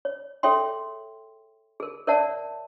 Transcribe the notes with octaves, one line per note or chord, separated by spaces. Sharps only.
C#5
G#4 A4 C#5 E5 G5 C6
G#4 A#4
A#4 C#5 D5 E5 F#5 A5